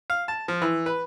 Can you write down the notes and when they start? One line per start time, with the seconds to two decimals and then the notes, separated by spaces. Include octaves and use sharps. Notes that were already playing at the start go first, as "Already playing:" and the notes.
0.10 F5
0.28 A5
0.48 F3
0.62 E3
0.86 B4